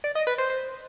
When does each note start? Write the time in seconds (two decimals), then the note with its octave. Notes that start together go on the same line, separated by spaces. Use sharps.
0.04 D5
0.15 D#5
0.27 B4
0.38 C5
0.50 C5